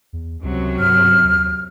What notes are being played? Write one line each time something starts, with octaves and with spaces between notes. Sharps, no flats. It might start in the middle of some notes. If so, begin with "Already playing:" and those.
E2
C#2 F#2 C3 F#3
G2 F6
D#2